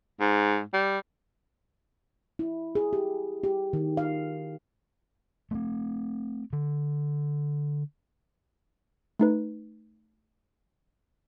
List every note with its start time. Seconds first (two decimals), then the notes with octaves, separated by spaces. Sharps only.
0.20 G#2
0.73 G3
2.39 E4
2.75 G#4
2.93 G4
3.43 G4
3.73 D#3
3.97 F5
5.51 A3 B3 C4
6.53 D3
9.19 A3 D#4 B4